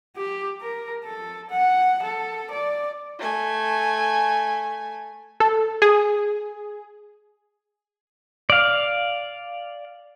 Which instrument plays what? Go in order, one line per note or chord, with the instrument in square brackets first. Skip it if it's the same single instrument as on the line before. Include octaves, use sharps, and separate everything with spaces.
[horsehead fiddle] G4
A#4
A4
F#5
A4
D5
[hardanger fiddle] A3 G#5
[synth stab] A4
G#4
[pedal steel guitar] D5 F5